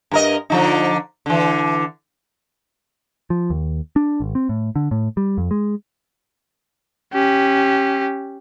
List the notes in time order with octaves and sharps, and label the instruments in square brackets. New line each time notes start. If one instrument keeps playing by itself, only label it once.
[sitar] G2 A#4 D#5
D3 F3 D#4
D3 E3
[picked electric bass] F3
D#2
D4
G#1
C4
A2
D3
A2
G3
F2
G#3
[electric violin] C#4 G4